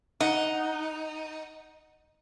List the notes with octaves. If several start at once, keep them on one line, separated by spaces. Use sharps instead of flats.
D#4 F#5